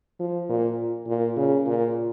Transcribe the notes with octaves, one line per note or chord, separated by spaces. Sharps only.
F3
A#2
A#2
C#3
A#2